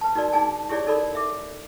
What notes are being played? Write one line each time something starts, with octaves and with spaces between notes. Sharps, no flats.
B4 A5
D#4 F#4 A#4 D5
D4 D#4 G#4 G#5 A5
E4 G4 G#4 C#5 D5
D#4 A4 A#4 D5 B5
E5 D6